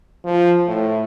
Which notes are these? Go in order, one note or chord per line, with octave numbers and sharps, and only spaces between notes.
F3
A2